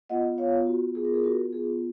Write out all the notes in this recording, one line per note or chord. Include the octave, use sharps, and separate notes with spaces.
B3 F4 D#5 F#5
C#5 F5
F#4
G#4
A#4
G#4
F#4 A#4
G#4